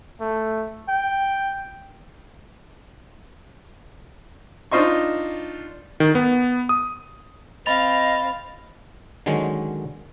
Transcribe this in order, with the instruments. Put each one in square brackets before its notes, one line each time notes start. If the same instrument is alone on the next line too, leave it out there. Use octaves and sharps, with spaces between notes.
[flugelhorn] A3
G5
[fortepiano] D4 D#4 F4 C5 D#5 C#6
[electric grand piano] D#3
B3
D#6
[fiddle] C4 F5 [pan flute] D#5 [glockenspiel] B5 A6 F7
[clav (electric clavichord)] D3 D#3 F#3 G#3 C#4